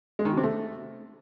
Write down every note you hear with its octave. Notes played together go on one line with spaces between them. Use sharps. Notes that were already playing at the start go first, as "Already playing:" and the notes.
G#3
D#3
B2
C3
A3